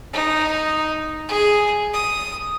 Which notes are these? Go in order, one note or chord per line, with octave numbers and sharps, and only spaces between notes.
D#4
G#4
D#6